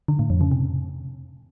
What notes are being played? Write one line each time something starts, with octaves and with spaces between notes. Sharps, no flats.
D3
A2
F2
C#3
C3